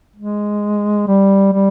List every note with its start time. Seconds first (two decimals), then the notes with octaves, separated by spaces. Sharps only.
0.16 G#3
1.08 G3
1.53 G3